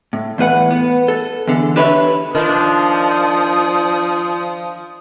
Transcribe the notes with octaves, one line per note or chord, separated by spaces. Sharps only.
A2
E2 A2 B4 F#5
B3
A4
E2 D3
D4 G4 B4 C#5 D5 E5
D#3 F3 D4 D#6